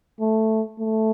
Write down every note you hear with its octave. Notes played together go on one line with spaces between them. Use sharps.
A3
A3